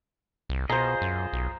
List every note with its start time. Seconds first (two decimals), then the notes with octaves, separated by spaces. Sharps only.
0.49 C2
0.70 B2 F4 G#4 C5 D#5 A#5
1.02 F#2
1.33 B1